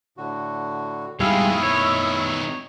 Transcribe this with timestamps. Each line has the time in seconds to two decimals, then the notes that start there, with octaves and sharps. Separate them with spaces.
0.17 A2 D3 F#4
1.20 D#3 G3 G#3 B3 E4 D#5 F5 E6
1.63 C#5